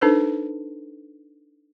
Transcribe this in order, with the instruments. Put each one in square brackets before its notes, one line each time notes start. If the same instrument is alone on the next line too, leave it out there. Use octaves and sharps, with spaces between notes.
[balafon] D4 D#4 A4 B4 C5